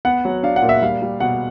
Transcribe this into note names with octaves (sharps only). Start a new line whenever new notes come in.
B3 F#5
F#3
D4 F5
F#5
A#2
E5
G3 F5
G3
B2 F#5